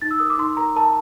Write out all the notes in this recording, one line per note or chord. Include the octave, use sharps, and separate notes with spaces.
D#4 A6
E6
A#4 D#6
D6
D#4 C6
A#4 A#5
A#4 A5